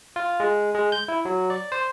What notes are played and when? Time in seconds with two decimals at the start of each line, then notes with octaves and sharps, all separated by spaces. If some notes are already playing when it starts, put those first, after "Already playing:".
0.16 F4
0.40 G#3
0.75 G#3
0.92 G6
1.08 E4
1.25 F#3
1.50 D5
1.72 C5